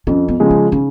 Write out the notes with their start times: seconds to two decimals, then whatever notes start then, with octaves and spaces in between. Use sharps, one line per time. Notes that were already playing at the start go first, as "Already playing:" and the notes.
0.07 F2 C#4
0.28 B3
0.40 C#3 F3 G#3
0.51 C#4
0.72 C#3 D#4